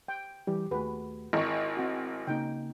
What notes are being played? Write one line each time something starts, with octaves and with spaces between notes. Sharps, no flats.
G5
E3 G3 G4
D#2 A3 F#4 G#4 B4
G#1 E4 A#4 C#6
C4 F#4
C#3 A#3 D#4 G5